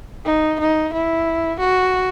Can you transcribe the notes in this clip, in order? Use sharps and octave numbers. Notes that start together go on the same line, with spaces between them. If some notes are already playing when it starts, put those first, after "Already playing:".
D#4
D#4
E4
F#4